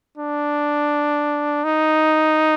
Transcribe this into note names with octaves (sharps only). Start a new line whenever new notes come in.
D4
D#4